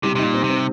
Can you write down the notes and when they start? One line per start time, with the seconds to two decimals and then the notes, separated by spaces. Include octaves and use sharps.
0.03 C3 G3
0.15 C3 D#4
0.23 A#2
0.34 C4
0.44 C3
0.50 C4